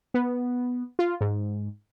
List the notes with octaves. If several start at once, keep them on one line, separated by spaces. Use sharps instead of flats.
B3
F4
G#2